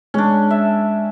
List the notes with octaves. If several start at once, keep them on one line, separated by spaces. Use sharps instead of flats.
G#3 C#4 D4
E5